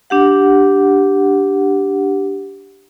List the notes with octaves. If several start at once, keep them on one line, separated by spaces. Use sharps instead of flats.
D4 G4 F#5